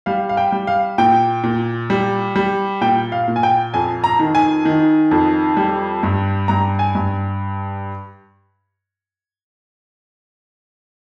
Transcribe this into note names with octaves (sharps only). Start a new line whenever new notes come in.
G3 F5
F5
G5
G3
F5
A#2 G5
A#2
G3
G3
A#2 G5
F5
A#2
G#5
G5
F2 G#5
A#5
D#3
G#5
D#3
F2
G3
G2
G2 A#5
G#5
G2